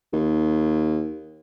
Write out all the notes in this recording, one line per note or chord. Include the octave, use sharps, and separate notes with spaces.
D#2